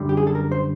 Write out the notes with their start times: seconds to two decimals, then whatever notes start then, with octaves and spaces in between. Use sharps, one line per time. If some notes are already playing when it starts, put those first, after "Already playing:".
Already playing: F#2 D3 G3
0.09 G4
0.17 G#4
0.27 A4
0.35 A#4
0.52 C5